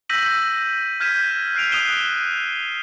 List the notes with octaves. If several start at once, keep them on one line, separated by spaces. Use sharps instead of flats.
E6 G6 A#6 B6 D#7 F#7
F6 G6 G#6 B6 D#7 E7
F#6 C7 D7 F7
D#6 F#6 D#7 E7 G7